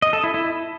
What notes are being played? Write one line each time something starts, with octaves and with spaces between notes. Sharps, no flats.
D#5
A4
E4
E4